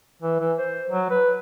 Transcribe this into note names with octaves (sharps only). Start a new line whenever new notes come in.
E3
E3
C5
F#3
B4